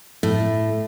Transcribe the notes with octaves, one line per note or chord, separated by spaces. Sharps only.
A2